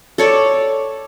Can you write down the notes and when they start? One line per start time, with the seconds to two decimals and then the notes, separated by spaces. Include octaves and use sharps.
0.18 A4 C#5 D5